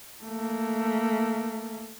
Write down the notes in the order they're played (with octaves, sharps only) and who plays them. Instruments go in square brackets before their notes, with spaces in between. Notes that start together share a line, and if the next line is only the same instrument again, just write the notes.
[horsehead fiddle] A3 A#3